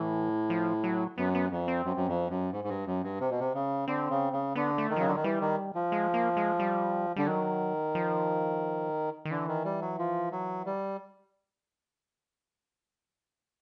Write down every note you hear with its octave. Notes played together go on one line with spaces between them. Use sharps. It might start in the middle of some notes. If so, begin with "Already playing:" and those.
Already playing: A2 E3
F3
F#3
F#2 B3
B3
F2
C4
F#2
F#2
F2
F#2
G#2
G#2
G2
F#2
G2
C3
B2
C3
C#3
D3 C4
C#3
C#3
D3 B3
A3
D#3
F3
C#3 F#3
D3
D#3
E3 G3
D#3
F3
G#3
A#3
G#3
G3
D3 G3
D#3 F#3
F3
D#3
D3 E3
D#3
G3
F#3
F3
F#3
G3